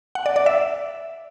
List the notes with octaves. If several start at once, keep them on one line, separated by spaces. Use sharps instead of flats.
F#5
D5
D5
E5